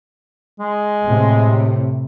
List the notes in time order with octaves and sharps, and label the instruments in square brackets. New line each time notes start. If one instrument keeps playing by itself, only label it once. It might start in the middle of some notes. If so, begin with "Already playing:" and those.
[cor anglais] G#3
[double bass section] A2 C3